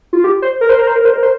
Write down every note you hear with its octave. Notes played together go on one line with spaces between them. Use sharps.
F4
G4
C5
A#4
C5
A#4
C5
A#4
C5
A#4
C5